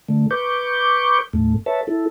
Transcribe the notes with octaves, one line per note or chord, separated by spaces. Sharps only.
D3 A3
B4 C#6 D6 G6
D#2 A2 A3
B4 C#5 E5 A5
E4 A4